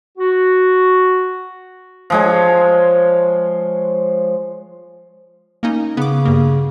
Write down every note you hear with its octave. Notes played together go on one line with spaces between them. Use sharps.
F#4
F3 G#3 C#5
A#3 C#4 D#4
C#3 B3 D6
G2 A#3